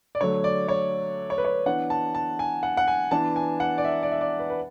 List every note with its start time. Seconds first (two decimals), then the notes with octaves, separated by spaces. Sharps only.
0.15 D5
0.20 D3 F#3 A3 C#5
0.44 D5
0.69 C#5
1.30 C#5
1.38 B4
1.45 C#5
1.66 E3 B3 D4 F#5
1.90 A5
2.15 A5
2.39 G#5
2.63 F#5
2.77 F#5
2.88 G#5
3.11 E3 B3 D4 A5
3.36 G#5
3.60 F#5
3.78 D5
3.85 E5
4.03 D5
4.12 E5
4.21 D5
4.39 B4
4.50 B4